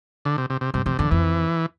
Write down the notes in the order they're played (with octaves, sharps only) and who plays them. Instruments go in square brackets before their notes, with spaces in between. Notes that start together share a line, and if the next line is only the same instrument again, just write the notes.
[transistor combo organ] D3
C3
C3
C3
[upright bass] G2 [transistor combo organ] C3
[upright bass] F2 [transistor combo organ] C3
[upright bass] E2 [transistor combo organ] D3
[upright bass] F2 [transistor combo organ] E3